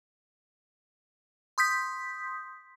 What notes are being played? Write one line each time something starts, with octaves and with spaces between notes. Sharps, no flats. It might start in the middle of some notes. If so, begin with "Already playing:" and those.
C6 D#6 G6 B6